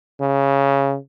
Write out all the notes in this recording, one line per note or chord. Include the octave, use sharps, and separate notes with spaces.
C#3